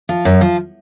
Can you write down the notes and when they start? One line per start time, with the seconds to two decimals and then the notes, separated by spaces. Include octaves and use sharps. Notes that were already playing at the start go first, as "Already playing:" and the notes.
0.09 F3
0.25 F#2
0.41 F3